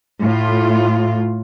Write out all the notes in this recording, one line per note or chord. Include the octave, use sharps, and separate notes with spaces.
A2 F4